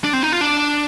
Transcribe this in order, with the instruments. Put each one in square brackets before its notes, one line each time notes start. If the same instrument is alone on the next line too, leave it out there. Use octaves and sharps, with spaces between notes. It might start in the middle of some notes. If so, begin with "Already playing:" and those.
[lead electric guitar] D4
C4
D#4
F4
D4